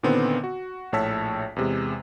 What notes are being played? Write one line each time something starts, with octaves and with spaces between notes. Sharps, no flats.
A#2 D3 D#3 B3 C4
F#4
A#1 A2 C#5 A5 E6 B6
E2 C3 G#3